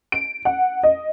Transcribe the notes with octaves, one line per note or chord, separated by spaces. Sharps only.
D7
F#5
D#5